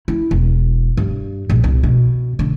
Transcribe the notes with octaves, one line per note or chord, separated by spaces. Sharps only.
E4
E1
G2
A#1
C2
B2
D3